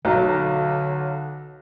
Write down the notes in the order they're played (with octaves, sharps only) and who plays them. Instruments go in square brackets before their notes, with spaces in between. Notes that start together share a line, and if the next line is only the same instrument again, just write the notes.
[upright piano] B1 F#3 [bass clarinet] D3